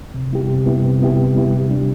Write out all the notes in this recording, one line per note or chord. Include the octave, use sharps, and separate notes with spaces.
C3
G3 B3 E4 G4
C3
G3 B3 E4 G4
C3
G3 B3 E4 G4
C3
G3 B3 E4 G4
C3
G3 D4